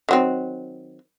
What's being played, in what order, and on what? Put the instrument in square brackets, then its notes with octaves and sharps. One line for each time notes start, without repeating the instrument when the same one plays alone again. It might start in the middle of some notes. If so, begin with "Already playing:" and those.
[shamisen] D#3 F#3 C4